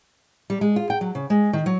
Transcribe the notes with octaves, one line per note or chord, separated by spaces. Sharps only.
G3
G#3
F4
G5
F#3
C#3
G#3
D#3
F#3